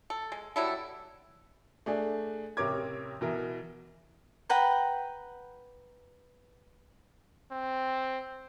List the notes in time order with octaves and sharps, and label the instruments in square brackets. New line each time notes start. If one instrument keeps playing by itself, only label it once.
[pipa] A4
G#3
F#3 G3 E4 A4
[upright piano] A3 D4 G#4
A1 C3 A#4 C#5 D6 G#6
B2 E3 A#4
[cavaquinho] B4 F#5 G5 A#5
[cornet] C4